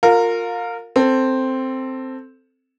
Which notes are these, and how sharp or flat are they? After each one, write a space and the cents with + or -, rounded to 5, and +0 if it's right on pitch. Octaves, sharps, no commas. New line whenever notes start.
F4 +25 A#4 -20 F5 +25
C4 +0 A4 +5